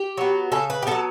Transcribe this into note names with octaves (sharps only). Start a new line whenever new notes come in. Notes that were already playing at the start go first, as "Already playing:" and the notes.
Already playing: G4
F#3 B3
C#3 A4
B4
G4
F#3 B3 A4